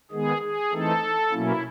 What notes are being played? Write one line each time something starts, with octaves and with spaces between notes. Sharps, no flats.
D#3 G#3 B3 G#4
G#4
E3 A3 C4 D#4 A4
B2 F#3 A#3 C#4 E4